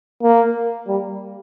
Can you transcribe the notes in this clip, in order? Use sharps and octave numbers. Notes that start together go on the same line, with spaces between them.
A#3
G3